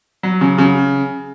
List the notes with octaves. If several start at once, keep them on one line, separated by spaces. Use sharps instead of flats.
F#3
C#3
C#3